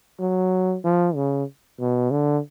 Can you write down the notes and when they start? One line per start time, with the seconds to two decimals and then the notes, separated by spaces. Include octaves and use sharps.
0.19 F#3
0.84 F3
1.15 C#3
1.80 B2
2.11 D3